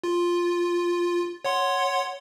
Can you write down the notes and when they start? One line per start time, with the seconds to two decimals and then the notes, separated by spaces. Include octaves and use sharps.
0.04 F4
1.45 C#5 F#5 C6